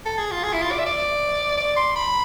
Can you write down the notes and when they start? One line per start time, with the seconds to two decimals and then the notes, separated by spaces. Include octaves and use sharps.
0.06 A4
0.18 G#4
0.31 F4
0.44 G#4
0.53 E4
0.62 F4
0.72 D5
0.79 E5
0.86 D5
1.58 D5
1.77 C6
1.96 B5